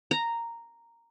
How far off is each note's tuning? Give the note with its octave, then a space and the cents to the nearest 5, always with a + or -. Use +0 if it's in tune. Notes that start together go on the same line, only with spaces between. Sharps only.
A#5 -5